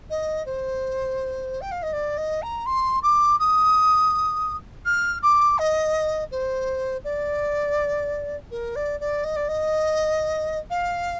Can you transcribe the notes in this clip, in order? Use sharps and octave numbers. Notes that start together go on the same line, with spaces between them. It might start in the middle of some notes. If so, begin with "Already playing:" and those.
D#5
C5
G5
F5
D#5
D5
D#5
A#5
C6
D6
D#6
F6
D6
D#5
C5
D5
A#4
D5
D5
D#5
D5
D#5
F5